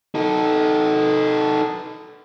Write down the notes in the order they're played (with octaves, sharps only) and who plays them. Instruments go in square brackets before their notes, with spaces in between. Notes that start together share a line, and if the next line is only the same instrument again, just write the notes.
[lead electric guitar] D#4 A4